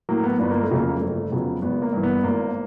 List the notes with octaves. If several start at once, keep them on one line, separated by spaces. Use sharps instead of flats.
A2 F#3 A#3
B3
G1 B3
A#3
A3
F2 C#3 F#3 A#3
G1 A3
F2 C#3 F#3 B3
G#1 B3
A#3
G2 E3
B3
G#1 A#3